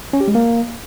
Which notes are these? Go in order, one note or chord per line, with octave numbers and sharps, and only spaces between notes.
C#4
G4
G#3
A#3